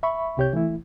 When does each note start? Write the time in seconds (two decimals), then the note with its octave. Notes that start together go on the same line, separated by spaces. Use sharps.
0.03 E5 B5 C#6
0.37 C2 C3 G4 C#5 G6
0.53 E3 A3 E4